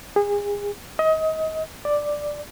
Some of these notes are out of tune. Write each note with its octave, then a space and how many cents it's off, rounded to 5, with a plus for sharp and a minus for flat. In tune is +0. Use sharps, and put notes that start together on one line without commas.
G#4 -30
D#5 +30
D5 +5